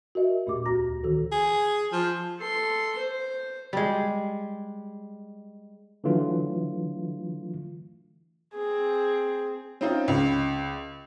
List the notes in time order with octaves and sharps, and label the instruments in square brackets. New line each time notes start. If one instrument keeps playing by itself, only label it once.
[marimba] F#4 A#4 D#5 E5
E2 A#2 A3 G4 D6
D2 F#4 A#5 A#6
D#3 E3 F#4 A4
[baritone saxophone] G#4
F3
[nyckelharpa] A4 C6
C5
[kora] G3 G#3
[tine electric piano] D3 E3 F#3 A3 F4
[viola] C4 G#4
[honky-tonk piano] C4 C#4 D#4 F4
C#2